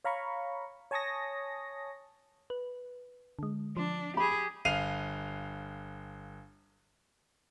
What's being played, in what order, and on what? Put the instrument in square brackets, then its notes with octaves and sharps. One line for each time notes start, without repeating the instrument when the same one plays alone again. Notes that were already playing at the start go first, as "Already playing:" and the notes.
[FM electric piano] C#5 F5 A#5 B5 C#6
C#5 G#5 A5 C#6 D#6 A#6
[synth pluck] B4
D3 G#3
[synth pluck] F3 [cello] D4
[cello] G4 G#4 [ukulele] B5
[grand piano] G1 F5 C7 D#7 F7